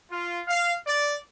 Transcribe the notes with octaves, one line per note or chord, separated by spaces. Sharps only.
F4
F5
D5